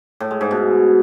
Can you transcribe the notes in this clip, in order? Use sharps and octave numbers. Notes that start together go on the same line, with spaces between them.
A2
G#3
G#2
B2